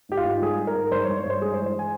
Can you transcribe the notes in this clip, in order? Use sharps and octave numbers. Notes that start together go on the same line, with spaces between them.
G#2 G4
F4
G#2
G3 G#4
G#2
A#4
G#2
G2 C5
C#5
G2
C#5
G2 C5
G#3 G#4
C5
E3
C5
G#5